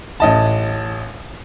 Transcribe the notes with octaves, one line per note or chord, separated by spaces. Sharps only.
A1 D#5 A5